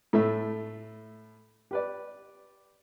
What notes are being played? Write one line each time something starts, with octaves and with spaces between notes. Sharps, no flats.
A2 A3 E5
G4 B4 D5